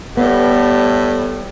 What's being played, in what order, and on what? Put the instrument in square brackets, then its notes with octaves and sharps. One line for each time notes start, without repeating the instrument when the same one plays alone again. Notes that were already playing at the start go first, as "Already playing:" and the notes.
[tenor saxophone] A2 [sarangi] G3 [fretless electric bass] B3 [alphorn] A4